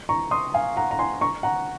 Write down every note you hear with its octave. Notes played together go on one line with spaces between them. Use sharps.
A#5 C#6
C6 D#6
F5 G#5
F#5 A#5
A#5
G#5 C6
A#5 C#6
F#5 A#5